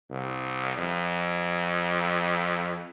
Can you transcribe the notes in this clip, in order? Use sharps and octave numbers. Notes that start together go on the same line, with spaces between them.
C2
F2